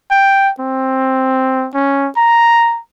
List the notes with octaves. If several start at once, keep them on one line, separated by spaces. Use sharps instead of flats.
G5
C4
C#4
A#5